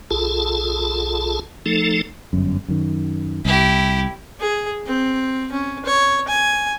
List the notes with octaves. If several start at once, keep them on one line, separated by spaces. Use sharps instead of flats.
B1 F4 G#4 A4 A5
F3 A3 D#4 A4
G1 F#2
F#2 D#3
C2 E4 G4
G#4
C4
C#4
C#5
G#5